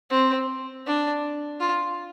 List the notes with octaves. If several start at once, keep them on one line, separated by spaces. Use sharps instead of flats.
C4
D4
F4